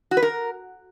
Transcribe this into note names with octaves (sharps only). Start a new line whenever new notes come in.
F#4
B4
A#4